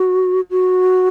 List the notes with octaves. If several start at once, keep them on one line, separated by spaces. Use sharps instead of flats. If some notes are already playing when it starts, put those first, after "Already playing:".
Already playing: F#4
F#4